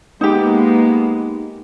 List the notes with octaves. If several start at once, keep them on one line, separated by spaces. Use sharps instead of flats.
G#3 A#3 B3 D#4 G4